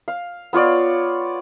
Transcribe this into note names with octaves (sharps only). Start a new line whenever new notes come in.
F5
B3 F4 C#5 D5